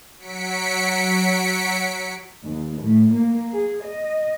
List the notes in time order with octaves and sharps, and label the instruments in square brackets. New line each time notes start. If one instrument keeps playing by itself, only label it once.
[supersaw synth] F#3 B6 C#7 D7
[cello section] D#2
A2
A#3
G#4
D#5